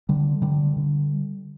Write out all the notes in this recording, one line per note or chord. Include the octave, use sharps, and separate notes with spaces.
D3 G3
D3 G3
D3